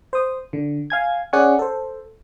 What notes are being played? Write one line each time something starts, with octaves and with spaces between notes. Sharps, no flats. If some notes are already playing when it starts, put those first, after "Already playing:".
C5 D#6
D3
F5 G#5 G#6
C#4 G#4 D5 F#5 G#5 C#6
A4 C5